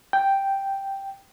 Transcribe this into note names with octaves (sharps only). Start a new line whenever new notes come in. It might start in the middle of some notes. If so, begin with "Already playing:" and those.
G5